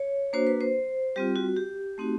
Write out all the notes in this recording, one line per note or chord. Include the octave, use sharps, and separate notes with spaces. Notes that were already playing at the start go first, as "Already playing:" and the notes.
Already playing: C#5
A#3 D4 F#4 C5
B4
C5
G3 C4 F4 G4
F#4
G4
A3 C4 D#4 F#4